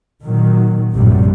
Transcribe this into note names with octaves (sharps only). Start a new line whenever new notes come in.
A#2 D#3 F#3
A#1 F#2 A2 C3 F#3 G3